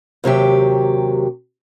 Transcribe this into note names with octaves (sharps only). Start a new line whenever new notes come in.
D#2 C3 F#3 G4